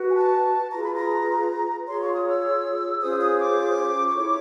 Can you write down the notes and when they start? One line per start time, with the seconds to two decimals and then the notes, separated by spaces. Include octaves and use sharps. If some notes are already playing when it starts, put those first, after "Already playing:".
Already playing: F#4 B4
0.10 G#5
0.15 A5
0.72 F4 G#4 B4 A#5
0.84 B5
0.94 A#5
1.86 F4 G#4 C#5 C6
2.00 C#6
2.15 D#6
2.29 E6
3.00 C#4 F4 G#4 C5 D#6
3.20 D#6
3.39 D6
4.08 C#6
4.15 E4 A4 C#5 D6